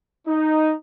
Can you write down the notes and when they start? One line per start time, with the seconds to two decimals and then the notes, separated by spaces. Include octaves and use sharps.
0.27 D#4